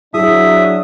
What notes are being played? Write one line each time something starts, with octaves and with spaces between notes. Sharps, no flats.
F#3 D4 E4 G#4 E5 D#6